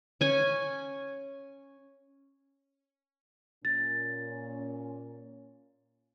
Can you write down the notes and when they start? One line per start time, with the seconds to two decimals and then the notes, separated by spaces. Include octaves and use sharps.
0.21 C#4 G#5
3.65 A#2 C#4 A6